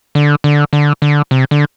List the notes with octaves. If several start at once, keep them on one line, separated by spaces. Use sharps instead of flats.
D3
D3
D3
D3
C3
D3